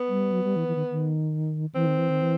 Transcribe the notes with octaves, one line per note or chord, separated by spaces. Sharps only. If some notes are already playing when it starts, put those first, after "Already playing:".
Already playing: B3
G3
F#3
G3
E3
E3
D#3
D#3
E3 C4
D#3
E3
D#3
E3